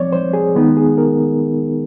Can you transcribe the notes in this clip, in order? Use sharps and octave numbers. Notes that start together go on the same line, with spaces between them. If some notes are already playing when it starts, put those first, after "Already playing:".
Already playing: F3 G#3 C4 C#5 D5
C5
G#4
D#3 G#3 B3 D#4
G#4
A#4